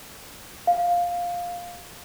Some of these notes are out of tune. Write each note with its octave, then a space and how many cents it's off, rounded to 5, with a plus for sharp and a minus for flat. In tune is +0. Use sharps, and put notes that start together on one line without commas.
F5 +10